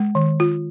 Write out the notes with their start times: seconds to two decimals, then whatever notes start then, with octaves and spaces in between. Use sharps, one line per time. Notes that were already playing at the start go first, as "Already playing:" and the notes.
Already playing: G#3
0.15 D#3
0.40 F4